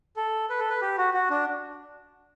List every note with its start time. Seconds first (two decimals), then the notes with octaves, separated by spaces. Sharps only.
0.16 A4
0.50 B4
0.59 A4
0.69 B4
0.81 G4
0.98 F#4
1.14 F#4
1.30 D4